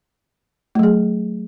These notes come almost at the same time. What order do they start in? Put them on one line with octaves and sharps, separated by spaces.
A3 F#3 G#4